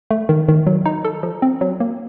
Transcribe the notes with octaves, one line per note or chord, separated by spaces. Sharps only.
A3
D#3
D#3
F#3
D#4
A4
F3
C4
F#3
A#3